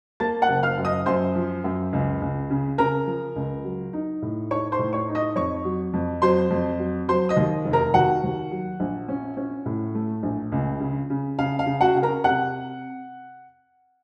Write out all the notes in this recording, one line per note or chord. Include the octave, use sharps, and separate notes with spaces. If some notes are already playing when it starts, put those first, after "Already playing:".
A#3 A5 A6
F#5 F#6
F#1
F5 F6
F#2
D#5 D#6
F#2 C5 C6
F3
F#2
C#2
C#2
C#3
C#3 A#4 A#5
F3
C#2
F#3
D#4
A2
D#4 C#5 C#6
C5 C6
A2
C#5 C#6
D#4
D#5 D#6
F2 C#5 C#6
F#3
F2
F#3 C5 C6
F2
F#3
F#3 C5 C6
D#5 D#6
D#2
F1
A#4 A#5
D#2 F#4 F#5
D#2
F#3
A#1
C#4
C#4
A2
A3
A#1
C#2
C#3
C#3
C#3 F5
F5
C#3
F#4 F#5
C#3
A#4 A#5
C3 F#5 F#6